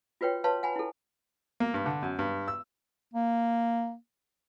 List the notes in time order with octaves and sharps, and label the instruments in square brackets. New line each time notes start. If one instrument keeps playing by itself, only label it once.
[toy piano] F4 F#4 B4 C#5 G5
B4 C#5 F5 A5 C6
F#5 G#5 B5
E4 A4
[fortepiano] A#3
G2
D3
F#2
G2
E6
[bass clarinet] A#3